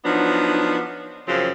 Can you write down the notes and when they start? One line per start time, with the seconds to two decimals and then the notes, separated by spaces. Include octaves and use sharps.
0.05 F3 F#3 B3 D4 D#4
1.27 F#2 C#3 F3 C4